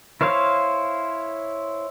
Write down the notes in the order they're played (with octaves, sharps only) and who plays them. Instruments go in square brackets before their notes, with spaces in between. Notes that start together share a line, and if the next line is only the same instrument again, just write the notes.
[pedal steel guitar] E4 C5 C#5 F5